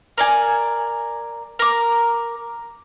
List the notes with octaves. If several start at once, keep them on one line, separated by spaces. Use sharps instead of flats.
A#4 D5 G#5
A#4 D6